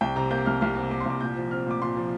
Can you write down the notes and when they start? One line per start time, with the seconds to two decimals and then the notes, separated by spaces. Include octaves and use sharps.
0.01 C2 G5
0.16 C3 A#5
0.31 A#3 G6
0.46 C2 F6
0.61 C2 F6
0.76 C3
0.91 A#3 D6
1.00 C6
1.06 C2 D6
1.21 A#2 G6
1.36 F3
1.51 C4 F6
1.66 A#2 D6
1.82 A#2 C6
1.96 F3